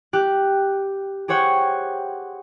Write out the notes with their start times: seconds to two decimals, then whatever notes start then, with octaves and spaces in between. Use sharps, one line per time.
0.13 G4 F#6
1.28 G4 G#4 C5 C#5 F#5 G5